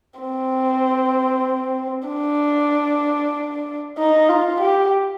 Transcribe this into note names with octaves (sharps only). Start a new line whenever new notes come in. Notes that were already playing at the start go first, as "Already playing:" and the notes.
C4
D4
D#4
F4
G4